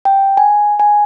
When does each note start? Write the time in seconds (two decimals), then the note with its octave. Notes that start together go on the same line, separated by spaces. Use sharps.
0.05 G5
0.37 G#5
0.80 G#5